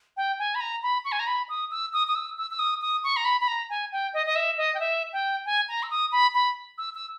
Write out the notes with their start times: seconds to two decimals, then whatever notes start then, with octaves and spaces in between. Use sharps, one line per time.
0.17 G5
0.39 G#5
0.55 B5
0.60 A#5
0.83 B5
1.05 C#6
1.12 G#5
1.19 A#5
1.27 B5
1.49 D#6
1.71 E6
1.93 D#6
2.07 D#6
2.15 E6
2.37 E6
2.51 E6
2.59 D#6
2.81 D#6
3.03 C#6
3.16 A#5
3.25 B5
3.41 B5
3.48 A#5
3.70 G#5
3.92 G5
4.14 D#5
4.26 D#5
4.35 E5
4.57 D#5
4.74 G5
4.80 E5
5.13 G5
5.46 G#5
5.68 A#5
5.83 E6
5.90 D#6
6.12 B5
6.34 B5
6.78 E6
6.95 E6